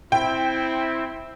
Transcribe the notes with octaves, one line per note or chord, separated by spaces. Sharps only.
C4 E4 G5